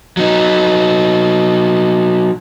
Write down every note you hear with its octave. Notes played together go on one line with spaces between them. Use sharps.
F#3 D#4